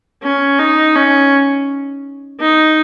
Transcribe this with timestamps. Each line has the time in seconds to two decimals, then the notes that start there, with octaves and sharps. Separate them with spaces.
0.23 C#4
0.59 D#4
0.96 C#4
2.40 D#4